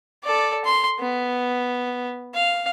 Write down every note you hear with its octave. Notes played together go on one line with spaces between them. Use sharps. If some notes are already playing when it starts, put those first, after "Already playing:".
A4 D5
C6
B3
F5